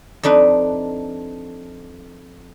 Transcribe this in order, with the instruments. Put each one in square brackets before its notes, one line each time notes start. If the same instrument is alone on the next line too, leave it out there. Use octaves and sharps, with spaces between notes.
[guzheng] F2 D4 D#4 B4